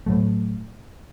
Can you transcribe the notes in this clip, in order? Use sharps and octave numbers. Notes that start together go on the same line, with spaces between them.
A2 F#3 A3